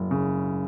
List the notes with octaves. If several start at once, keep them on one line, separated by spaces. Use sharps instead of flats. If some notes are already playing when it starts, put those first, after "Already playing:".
Already playing: F#1 F#3
C#3